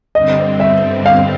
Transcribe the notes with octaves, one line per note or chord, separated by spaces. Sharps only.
G2 D3 G3 C4 D#5
E5
F5